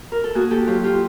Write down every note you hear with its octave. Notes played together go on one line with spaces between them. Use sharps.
A#4
A4
A#3 F#4 G#4
G4 A4
F#3 F4 G4
F4 G4